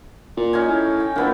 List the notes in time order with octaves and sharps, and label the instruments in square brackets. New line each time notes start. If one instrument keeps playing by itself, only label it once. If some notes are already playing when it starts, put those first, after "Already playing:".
[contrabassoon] A#2
[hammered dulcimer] C#4 D#4 G#5
[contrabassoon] A2
[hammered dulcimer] G5
[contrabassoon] A#1 [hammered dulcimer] A#3 B3 E4